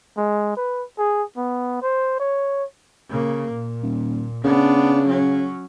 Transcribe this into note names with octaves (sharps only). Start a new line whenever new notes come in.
G#3
B4
G#4
B3
C5
C#5
C#3 A#3
A#2
D#1
C#3 B3 D4
F#3 C#4